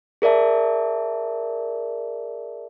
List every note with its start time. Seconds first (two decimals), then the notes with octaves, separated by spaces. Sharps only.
0.22 G#4 A#4 D5 E5 A5